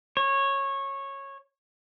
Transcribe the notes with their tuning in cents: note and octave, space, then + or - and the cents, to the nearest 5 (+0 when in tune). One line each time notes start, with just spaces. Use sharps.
C#5 -15